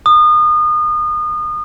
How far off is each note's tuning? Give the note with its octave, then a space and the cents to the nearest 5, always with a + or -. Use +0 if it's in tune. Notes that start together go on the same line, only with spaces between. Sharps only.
D#6 -30